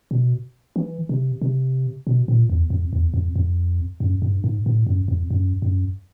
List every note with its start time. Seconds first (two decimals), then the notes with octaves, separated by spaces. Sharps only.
0.11 B2
0.76 E3
1.09 C3
1.42 C3
2.07 B2
2.28 A#2
2.50 E2
2.70 F2
2.93 E2
3.14 F2
3.36 F2
4.00 F#2
4.22 G2
4.44 G#2
4.66 A2
4.87 F#2
5.08 F2
5.31 F#2
5.62 F#2